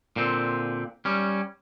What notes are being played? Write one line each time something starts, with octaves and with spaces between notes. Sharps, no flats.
A#2 D3 C4
G3 C#4